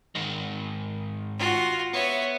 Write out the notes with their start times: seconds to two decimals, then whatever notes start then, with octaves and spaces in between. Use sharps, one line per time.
0.15 G#2 D#3
1.38 F4 F#4
1.93 B3 C#5 E5